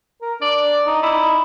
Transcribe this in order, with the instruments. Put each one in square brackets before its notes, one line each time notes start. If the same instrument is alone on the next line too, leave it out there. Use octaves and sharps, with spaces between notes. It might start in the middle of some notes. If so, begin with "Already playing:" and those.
[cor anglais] A#4
[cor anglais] D4 [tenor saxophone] D5
[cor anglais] D#4
[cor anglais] D#4 [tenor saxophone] E4